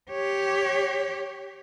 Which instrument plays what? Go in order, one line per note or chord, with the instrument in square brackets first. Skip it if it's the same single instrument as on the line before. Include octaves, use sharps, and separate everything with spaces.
[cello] G4 C#5